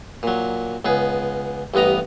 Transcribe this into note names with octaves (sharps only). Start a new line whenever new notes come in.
A#2 F#3
C#2 B3 G#4
A1 G2 B3 D#5 A#5